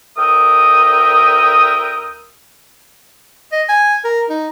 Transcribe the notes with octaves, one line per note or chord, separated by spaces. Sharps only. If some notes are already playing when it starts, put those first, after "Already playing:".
D2 A#4 E5 G5 D#6
D#5
G#5
A#4
D#4